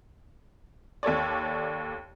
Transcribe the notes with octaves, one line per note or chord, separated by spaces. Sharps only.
D#2 A4 C#5 D5